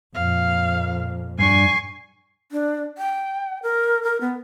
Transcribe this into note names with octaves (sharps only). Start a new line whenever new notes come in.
F2 A#2 F5
G2 D4 G#5 C#6 C7
D4
G5
A#4
A#4
B3